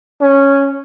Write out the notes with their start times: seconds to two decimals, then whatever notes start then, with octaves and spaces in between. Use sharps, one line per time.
0.21 C#4